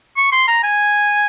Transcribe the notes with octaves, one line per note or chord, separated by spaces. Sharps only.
C#6
C6
A#5
G#5